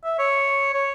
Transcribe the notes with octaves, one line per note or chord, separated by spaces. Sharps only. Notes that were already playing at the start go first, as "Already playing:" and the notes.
E5
C#5
C#5